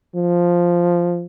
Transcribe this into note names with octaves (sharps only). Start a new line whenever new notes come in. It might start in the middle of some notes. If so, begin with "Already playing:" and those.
F3